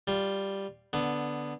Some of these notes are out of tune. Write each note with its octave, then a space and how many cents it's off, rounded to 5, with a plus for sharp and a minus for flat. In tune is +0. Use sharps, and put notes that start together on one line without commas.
G3 +0 F4 +0
D3 +0 B3 +0